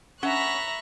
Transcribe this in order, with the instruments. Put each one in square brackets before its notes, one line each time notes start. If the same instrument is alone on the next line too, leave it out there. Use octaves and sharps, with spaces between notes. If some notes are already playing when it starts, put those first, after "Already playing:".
[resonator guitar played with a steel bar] C#4 F#5 [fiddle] E5 A#5 [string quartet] B5 C#6 F#6